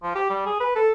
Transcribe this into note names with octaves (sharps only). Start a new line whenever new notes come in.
F3
G4
G3
G#4
B4
A4